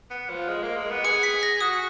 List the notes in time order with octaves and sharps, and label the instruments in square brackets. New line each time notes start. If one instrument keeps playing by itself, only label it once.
[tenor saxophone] B3
F3
G#3
A#3
G#3
B3
[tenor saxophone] G#4 [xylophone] C#7
[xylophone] B6
A#6
[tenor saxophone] F#4 [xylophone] D#6